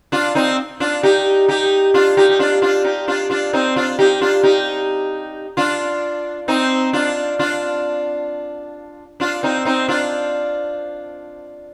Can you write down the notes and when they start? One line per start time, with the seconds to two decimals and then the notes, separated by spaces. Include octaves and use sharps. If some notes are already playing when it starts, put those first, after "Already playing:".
0.12 D4 F4
0.35 C4 D#4
0.80 D4 F4
1.03 D#4 G4
1.48 D#4 G4
1.94 D4 F4
2.17 D#4 G4
2.29 G4
2.39 D4 F4
2.62 D4 F4
2.84 D#4 G4
3.08 D4 F4
3.30 D4 F4
3.53 C4 D#4
3.76 D4 F4
3.99 D#4 G4
4.21 D4 F4
4.43 D#4 G4
5.57 D4 F4
6.48 C4 D#4
6.93 D4 F4
7.39 D4 F4
9.20 D4 F4
9.43 C4 D#4
9.65 C4 D#4
9.88 D4 F4